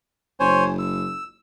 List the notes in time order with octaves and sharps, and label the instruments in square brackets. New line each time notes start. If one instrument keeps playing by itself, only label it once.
[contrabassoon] F#1 [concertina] C5 C#5 G#5
[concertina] E6